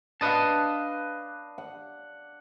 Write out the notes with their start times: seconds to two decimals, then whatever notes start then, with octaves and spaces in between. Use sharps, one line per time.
0.21 D4 B4 D#5 F5 A5
1.58 F#5